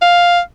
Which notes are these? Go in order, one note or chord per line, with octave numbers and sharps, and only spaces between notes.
F5